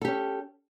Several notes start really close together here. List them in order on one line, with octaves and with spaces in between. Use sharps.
A4 G4 C#4